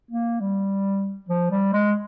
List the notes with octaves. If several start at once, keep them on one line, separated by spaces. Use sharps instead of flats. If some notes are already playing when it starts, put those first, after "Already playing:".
A#3
G3
F3
G3
G#3